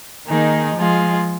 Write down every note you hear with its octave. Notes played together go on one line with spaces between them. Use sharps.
D#3 A#3 D#4 G#4
F3 G#3 F4 G#4